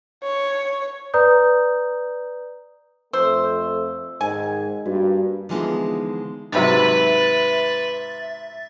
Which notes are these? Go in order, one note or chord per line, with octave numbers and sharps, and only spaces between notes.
C#5
B4 D5 A#5 D#6 G6
F2 A3 C5 E6
G#2 D#3 G#5
G2 A#3 F#4
D3 E3 F3 G#3 B3 D#4
G#2 C3 F#3 B4 E5 A6